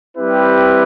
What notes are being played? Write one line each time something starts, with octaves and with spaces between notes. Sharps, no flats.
G3 C4 E4 G4 B4